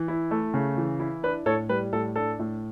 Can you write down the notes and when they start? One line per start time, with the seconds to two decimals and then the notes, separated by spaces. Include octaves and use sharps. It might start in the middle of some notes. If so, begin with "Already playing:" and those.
Already playing: E3
0.08 E4
0.31 A3
0.54 C#3
0.77 E3
1.00 E4
1.23 D4 B4
1.46 A2 A4 C#5
1.69 G3 B4
1.92 A2 A4
2.16 D4 A4
2.39 A2